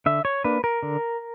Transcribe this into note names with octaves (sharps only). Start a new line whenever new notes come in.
D3 E5
C#5
A#3 D4 B4
A#4
D3